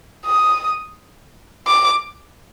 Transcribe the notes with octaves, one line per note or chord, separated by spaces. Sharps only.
D#6
D6